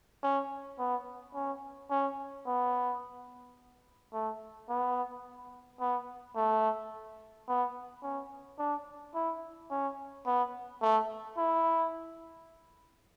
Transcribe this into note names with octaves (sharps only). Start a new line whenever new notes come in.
C#4
B3
C#4
C#4
B3
A3
B3
B3
A3
B3
C#4
D4
E4
C#4
B3
A3
E4